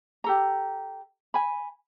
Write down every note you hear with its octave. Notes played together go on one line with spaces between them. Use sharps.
G4 A4 A#5
G#5 B5